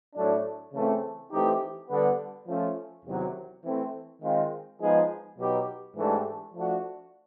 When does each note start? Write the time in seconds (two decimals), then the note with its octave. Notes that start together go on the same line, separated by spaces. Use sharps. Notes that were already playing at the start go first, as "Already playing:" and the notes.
0.15 A2 F#3 A3 D4
0.72 C#3 E3 A3 C4
1.31 E3 A3 C4 D#4 G4
1.89 D3 G3 B3
2.47 F3 A3 C#4 F4
3.05 E2 C3 D#3 F#3
3.64 E3 A3 C4
4.22 D#3 G#3 C4 F4
4.80 F3 G#3 B3 D#4 G#4
5.38 B2 F#3 B3 D#4 G4
5.97 G#2 E3 A3 D4 G4
6.54 F3 A3 D4 F#4